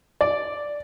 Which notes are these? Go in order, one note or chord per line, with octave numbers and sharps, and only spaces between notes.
D5